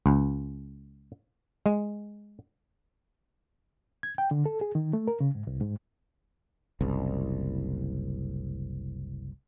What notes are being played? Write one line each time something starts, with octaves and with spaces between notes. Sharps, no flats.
C#2
G#3
G#6
G5
D3
A4
G#4
D#3
A3
A#4
C#3
G#2
C2
G#2
F#1 C2